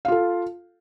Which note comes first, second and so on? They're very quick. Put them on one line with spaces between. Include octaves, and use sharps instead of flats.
F5 F4 A4